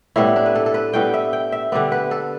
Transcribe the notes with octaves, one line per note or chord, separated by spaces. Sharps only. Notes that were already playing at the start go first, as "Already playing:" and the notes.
A2 G3 B3 E4
D4
B4
A4
A4
B4
A2 G3 B3 G5
E5
G5
E5
D3 G3 B3 D5
B4
A4